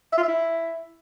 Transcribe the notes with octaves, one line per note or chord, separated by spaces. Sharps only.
E5
F4
E5
E4